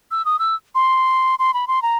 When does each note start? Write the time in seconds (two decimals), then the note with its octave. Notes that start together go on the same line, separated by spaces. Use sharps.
0.11 E6
0.25 D#6
0.39 E6
0.75 C6
1.39 C6
1.54 B5
1.68 C6
1.82 A#5